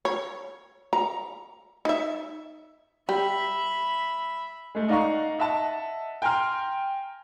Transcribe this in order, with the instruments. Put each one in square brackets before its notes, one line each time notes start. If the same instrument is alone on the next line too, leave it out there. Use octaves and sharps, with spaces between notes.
[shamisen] C#5
A#5
D#4 E5
[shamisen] G3 [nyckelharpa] E5 B5
[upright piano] G#3 A3
D#4 D5 F5 F#5 A#5 C#6
D#5 E5 F#5 A5
G5 G#5 A#5 C6 F6